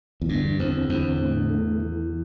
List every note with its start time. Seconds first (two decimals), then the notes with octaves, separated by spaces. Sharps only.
0.22 E2
0.29 G2 D3
0.59 E2 C4
0.89 E2 D3
1.20 A2
1.50 A3
1.80 E3